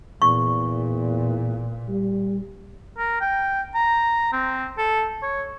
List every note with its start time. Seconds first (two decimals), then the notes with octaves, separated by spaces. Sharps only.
0.22 E2 A#2 C#6
1.88 G3
2.98 A#4
3.21 G5
3.75 A#5
4.33 C4
4.78 A4
5.23 C#5